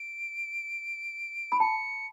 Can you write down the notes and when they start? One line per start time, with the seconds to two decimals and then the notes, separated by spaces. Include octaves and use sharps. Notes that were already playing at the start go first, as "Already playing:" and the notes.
Already playing: D7
1.52 B5
1.60 A5 C#7